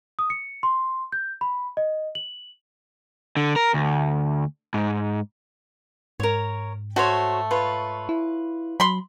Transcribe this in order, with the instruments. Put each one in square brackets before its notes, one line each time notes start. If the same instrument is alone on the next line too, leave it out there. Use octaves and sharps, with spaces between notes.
[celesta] D#6
C#7
C6
G6
B5
D#5
F#7
[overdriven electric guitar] D3
A#4
D2
G#2
[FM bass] G#2 [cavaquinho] A#4 C#5
[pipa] A3 [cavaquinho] F#4 C5 C#5
[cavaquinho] F4 B4 C#5
[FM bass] E4
[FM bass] F#3 [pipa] B5 C6